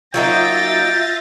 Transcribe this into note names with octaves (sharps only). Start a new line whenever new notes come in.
F#3 A#3 D#4 F4 E5 G5 A6 A#6